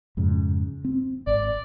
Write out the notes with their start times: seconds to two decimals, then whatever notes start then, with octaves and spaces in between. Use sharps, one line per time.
0.17 F2 G#2 C#3
0.85 C4
1.27 G#1 D5